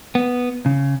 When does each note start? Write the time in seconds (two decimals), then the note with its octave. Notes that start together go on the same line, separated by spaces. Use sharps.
0.15 B3
0.66 C#3